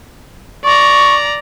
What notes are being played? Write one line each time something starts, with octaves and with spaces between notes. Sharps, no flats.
D5 A#5 C#6